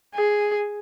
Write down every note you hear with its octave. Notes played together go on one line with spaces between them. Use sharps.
G#4